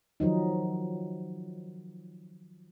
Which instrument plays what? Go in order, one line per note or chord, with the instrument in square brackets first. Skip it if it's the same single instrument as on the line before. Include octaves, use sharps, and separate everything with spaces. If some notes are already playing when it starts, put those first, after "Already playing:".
[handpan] D#3 F3 F#3 D#4